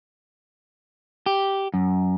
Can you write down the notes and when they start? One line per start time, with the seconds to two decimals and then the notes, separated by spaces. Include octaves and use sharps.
1.26 G4
1.74 F#2